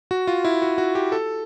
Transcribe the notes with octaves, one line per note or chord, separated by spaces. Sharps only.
F#4
F4
E4
F#4
F#4
G4
A4